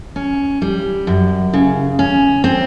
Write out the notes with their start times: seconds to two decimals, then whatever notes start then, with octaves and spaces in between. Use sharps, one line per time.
0.16 C#4
0.62 G3
1.07 F#2
1.54 C#3
1.99 C#4
2.44 C4